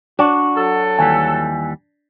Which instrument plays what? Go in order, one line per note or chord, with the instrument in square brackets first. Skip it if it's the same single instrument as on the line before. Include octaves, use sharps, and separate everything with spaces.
[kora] D4 [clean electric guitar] F#4
[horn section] F#3 A4
[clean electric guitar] D#2 E3 G3 [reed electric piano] G#5